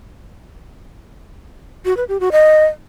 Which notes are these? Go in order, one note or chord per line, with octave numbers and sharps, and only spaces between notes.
F#4
B4
G4
F#4
D#5